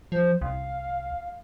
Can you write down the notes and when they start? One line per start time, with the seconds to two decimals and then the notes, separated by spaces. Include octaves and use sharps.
0.12 F3 C5
0.41 C2 F5